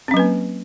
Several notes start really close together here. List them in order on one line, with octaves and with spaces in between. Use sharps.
C4 C#4 F#3 B4 A#3